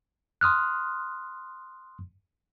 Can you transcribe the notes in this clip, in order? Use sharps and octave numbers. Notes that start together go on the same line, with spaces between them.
C6 D#6 F6 F#6